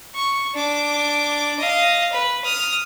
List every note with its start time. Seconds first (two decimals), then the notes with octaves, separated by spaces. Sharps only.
0.15 C#6
0.55 D4 D6
1.60 D#5 F5
2.12 B4
2.45 D#6 F6